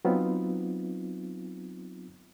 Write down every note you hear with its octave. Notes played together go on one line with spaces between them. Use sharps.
F#3 B3 C4 D#4 F4